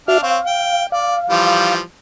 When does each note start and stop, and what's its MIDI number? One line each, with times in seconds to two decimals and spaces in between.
0.08 0.20 62
0.08 0.18 66
0.08 0.18 76
0.08 0.20 77
0.08 0.20 89
0.23 0.37 60
0.23 0.37 73
0.23 0.87 77
0.47 0.84 79
0.92 1.15 74
0.92 1.75 77
1.30 1.80 52
1.30 1.80 53
1.30 1.80 55